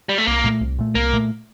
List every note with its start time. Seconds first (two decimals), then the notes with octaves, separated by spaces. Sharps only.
0.09 G3
0.18 A3
0.27 C2 A#3
0.44 A#2 A3
0.61 C2
0.79 A#2 A3
0.95 C2 A#3
1.13 A#2 A3